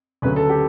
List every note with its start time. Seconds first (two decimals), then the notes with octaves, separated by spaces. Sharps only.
0.22 D2 C#3 F#3 B4
0.36 A4
0.49 G4